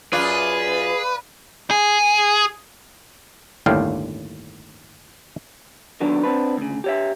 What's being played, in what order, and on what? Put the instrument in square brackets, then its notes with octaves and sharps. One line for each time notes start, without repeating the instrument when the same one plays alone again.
[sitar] F#2 F4 [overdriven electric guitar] G#4 [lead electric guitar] B4 [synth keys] D5 F5
[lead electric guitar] G#4
[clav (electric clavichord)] G1 D#2 A2 D4 F5 G5
[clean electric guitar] D3 D#3 F#3 B3 D4
C4 D4 B4
D2 C#3
G4 C#5 E5